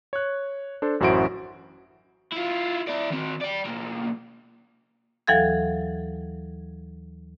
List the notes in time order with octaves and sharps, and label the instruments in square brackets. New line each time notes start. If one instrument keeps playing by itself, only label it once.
[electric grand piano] C#5 F#6
D4 A4 C5
A1 F#2 E4 F#4 C5 D7
[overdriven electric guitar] E4 F4
E4 D5
D#3 C4
D5 G5
B1 A#3
[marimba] D#2 E3 F#3 A4 F5 G#6